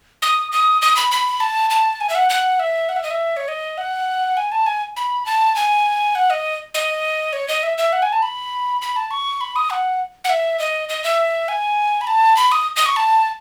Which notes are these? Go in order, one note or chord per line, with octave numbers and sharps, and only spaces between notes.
D#6
D#6
D#6
B5
B5
A5
A5
G#5
E5
F#5
F#5
E5
F#5
E5
D#5
E5
C#5
D#5
F#5
G#5
A5
G#5
B5
A5
G#5
F#5
D#5
D#5
C#5
D#5
E5
E5
F#5
G#5
A5
B5
B5
A5
C#6
B5
D#6
F#5
F#5
E5
D#5
D#5
E5
G#5
B5
A5
B5
D#6
D#6
C#6
A5